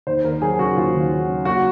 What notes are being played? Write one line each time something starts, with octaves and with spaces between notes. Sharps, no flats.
D#2 C5
D#2 A#4
F#3 G#4
C#3 F#4
D#2 F4
D#2
F#3
C#3
A#3 F#4